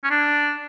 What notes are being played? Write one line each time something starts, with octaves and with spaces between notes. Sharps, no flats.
C#4
D4